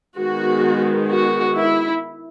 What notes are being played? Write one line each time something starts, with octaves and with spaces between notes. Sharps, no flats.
D#3 G#3 B3 F#4
F#4
E4